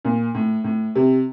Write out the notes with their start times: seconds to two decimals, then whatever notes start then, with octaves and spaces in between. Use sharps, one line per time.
0.05 A#2
0.34 A2
0.64 A2
0.95 C3